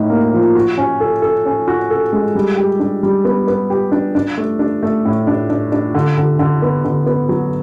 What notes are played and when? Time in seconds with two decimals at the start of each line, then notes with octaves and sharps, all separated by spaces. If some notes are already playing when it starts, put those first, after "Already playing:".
Already playing: A2 D#4
0.10 A#3
0.33 F3
0.55 F#4
0.78 C#4
1.00 A4
1.22 A4
1.46 C#4
1.68 F#4
1.90 A4
2.13 G#3
2.35 G3
2.57 G4
2.80 D4
3.03 G3
3.25 B3
3.48 B3
3.70 G4
3.92 D4
4.15 D4
4.38 A3
4.59 D4
4.83 A3
5.05 A2
5.27 D4
5.50 D4
5.72 D4
5.95 D3
6.18 D3
6.39 D3
6.62 B3
6.85 D3
7.06 B3
7.29 F#3